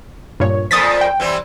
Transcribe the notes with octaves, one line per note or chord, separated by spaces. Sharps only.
G2 A#2 C#5
F2 A#2 F3 D#6 A6 B6
G5
E3 G3 C4